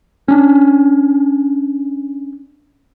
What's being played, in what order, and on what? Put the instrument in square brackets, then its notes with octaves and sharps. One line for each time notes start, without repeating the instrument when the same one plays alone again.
[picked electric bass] C#4 D4